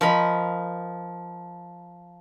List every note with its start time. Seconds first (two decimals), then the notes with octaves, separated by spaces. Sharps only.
0.01 F3 A#4 D#5 B5